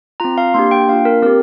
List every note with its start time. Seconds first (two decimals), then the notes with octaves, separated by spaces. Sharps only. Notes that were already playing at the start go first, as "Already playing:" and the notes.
0.20 C4 F4 A#5
0.38 F5
0.54 A#3 D4 G4 C6
0.71 G5
0.88 A#3 D4 F4 F5
1.05 A#4
1.22 C4 G4 A#4